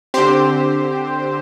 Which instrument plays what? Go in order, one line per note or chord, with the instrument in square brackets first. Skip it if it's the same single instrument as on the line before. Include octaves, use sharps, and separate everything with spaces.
[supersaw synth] D3 C4 G4 C5